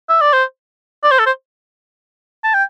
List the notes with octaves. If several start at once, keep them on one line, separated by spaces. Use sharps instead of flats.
E5
D5
C5
D5
C5
A4
C5
A5
G5